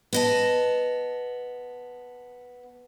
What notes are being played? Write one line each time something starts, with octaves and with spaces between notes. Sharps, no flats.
B3 D#5 A5